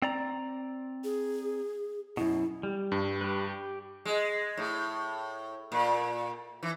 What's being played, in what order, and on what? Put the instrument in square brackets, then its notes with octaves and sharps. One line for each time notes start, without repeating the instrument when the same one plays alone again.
[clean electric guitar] C4 D5 A#5
[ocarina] G#4
[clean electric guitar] F#2 B2 [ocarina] E4
[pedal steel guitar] G3
[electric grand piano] G2
[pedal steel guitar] G4 B4
G4
[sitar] G#3
A2
A#2
E3